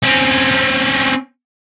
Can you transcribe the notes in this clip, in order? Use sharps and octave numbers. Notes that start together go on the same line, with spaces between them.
C4 C#4